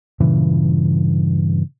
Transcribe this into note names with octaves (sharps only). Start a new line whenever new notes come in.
G2 A#2 C#3 E3